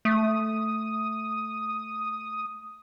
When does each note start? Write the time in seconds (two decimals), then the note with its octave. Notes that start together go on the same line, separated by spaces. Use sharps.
0.05 A3 D#6